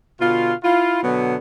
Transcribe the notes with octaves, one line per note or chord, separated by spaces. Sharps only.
B2 D3 F4
E4 F4
B2 D3 F#3 B3